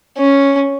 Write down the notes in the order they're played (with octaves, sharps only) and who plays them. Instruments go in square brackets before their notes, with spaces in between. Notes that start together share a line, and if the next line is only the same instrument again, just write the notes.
[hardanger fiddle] C#4